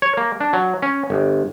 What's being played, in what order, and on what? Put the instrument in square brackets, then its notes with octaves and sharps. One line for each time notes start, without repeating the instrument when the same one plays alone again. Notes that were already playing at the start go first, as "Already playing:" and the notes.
[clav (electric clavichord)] C#5
A#3
D4
F#3
C#4
G1